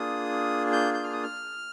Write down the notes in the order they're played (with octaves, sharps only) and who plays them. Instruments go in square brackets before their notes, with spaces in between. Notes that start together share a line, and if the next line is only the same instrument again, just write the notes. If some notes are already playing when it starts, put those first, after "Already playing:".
Already playing: [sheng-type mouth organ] A#3 D4 F4 G#4 D#6
G6
G6
F6
D#6
F6